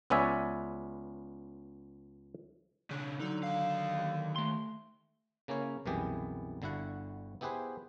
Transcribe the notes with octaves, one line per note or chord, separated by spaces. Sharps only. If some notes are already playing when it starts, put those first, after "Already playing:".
C#2 B3 C#4 D5 E5 G#5
C#3 D4
D3 F#3 D#4
D#3 F5
A3 C6
C#3 A#3 C#4 E4 C#5
C2 F#2 B2 E3 G4 G#4
G1 D3 E4 F#4 F#5
B3 E4 G4 G#4 B4 C5